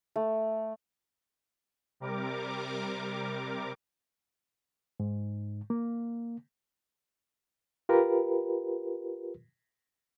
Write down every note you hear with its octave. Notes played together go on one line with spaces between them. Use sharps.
A3
C3 G3 A#4 D6
G#2
A#3
F4 G4 A#4 B4